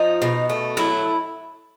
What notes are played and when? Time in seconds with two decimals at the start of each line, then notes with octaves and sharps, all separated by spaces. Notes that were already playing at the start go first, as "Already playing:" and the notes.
Already playing: F3 D#4
0.22 B2
0.50 A3
0.77 F#3 E4